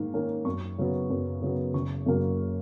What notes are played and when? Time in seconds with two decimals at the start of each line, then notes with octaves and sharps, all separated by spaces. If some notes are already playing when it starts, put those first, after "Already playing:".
Already playing: G#2 D#3 A#3
0.14 D#3 A#3 C#4
0.45 F#2 C#6
0.78 C#3 F#3 B3
1.10 F#2
1.42 C#3 F#3 B3
1.74 F#1 C#6
2.06 F#2 C#3 F#3 A#3